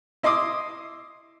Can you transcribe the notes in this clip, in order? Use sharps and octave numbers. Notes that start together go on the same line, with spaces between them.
E4 D#5 C6 D6 D#6